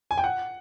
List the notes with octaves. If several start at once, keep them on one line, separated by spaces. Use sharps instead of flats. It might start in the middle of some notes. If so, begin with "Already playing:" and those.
G#5
G5
F#5